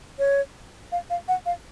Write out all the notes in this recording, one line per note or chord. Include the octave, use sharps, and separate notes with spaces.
C#5
F5
F5
F#5
F5